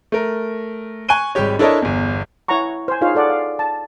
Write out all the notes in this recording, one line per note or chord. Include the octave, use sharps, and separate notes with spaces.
A3 A#4
G#5 C#6 F#6 D#7 G7
G#1 G3 G#3 G4 C#5
D4 E4 A4 A#4 C#5 D#5
G1 E2
E4 C#5 F#5 G#5 A#5 C#6
C5 G#5
D#4 F4 G#4 C5 C#5 F5
G#4 A4 D5 F#5
F5
A5